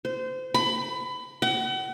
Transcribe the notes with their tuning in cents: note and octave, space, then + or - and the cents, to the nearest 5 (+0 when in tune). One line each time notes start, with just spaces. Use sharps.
C5 -25
B5 +25
F#5 +40